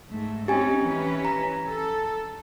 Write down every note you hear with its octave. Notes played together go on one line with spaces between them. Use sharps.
G#2 A3
C4 C#4 D#4 G4 G#5
E3 C#4 B4
A#5
A4